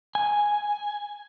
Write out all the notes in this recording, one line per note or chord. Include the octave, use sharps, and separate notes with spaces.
G#5